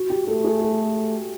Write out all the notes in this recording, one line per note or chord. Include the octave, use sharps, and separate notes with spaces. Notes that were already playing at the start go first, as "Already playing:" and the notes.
Already playing: F#4
G4
A3 A4
G#4
A4